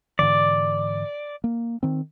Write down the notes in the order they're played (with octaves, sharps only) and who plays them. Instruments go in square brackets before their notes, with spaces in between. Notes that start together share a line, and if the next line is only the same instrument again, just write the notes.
[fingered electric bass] G#2 D3 E3 [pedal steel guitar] D5
[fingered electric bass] A#3
D#3 C4